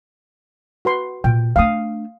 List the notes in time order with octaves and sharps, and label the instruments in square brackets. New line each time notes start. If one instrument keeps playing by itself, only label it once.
[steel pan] F#4 B4 C6
[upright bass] A#2 [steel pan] G5
[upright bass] A3 D4 [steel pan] F5 G5 D#6